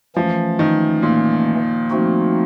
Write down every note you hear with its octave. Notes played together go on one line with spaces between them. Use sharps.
E3 F3 A3 C#4
D#3
A#2
F3 A3 C4 D#4 F#4